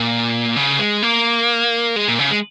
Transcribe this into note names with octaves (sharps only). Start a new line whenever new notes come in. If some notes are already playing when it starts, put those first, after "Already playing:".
Already playing: A#2
C#3
G#3
A#3
G#3
A#2
C#3
G#3